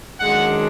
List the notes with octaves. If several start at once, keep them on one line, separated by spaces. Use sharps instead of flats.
F#2 D#3 G#3 D4 F#5